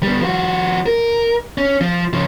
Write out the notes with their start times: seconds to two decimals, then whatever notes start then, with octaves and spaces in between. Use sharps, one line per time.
0.03 G3 B3
0.21 F3 F#4
0.86 A#4
1.58 C#4
1.81 F3
2.13 C#3 F3